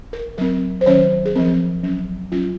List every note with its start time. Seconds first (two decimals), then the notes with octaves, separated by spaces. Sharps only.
0.13 A#4
0.38 F#3 C4 A#4
0.81 C5
0.86 D#3 F#3 C#4 C#5
1.25 G#4
1.35 F3 C4 A#4
1.83 F#3 C#4
2.32 F#3 C#4 F4